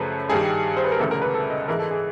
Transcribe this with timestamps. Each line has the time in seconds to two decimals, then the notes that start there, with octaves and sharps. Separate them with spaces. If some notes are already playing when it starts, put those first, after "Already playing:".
Already playing: F#2 C#3 F3 A3 C#4 B4
0.30 G2 D#3 G3 G#4
0.77 C5
0.84 B4
0.91 A#4
0.99 E1 D2 C#3 E3 A4
1.11 A#4
1.22 B4
1.34 A4
1.50 D#5
1.68 G#2 E3 G#3 A#4
1.79 A4
1.91 G#4